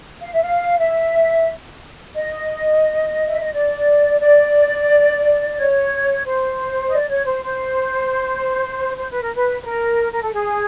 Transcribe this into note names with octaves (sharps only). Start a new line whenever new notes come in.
F5
E5
F5
E5
D#5
E5
D#5
D5
D5
C#5
C5
D#5
D5
C#5
C5
C5
C5
B4
A#4
B4
B4
A#4
A#4
A4
G#4